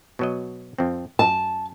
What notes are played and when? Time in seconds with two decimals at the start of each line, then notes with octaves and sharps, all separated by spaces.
0.19 B2 F#3 D#5
0.78 F2 C4
1.19 F#2 A5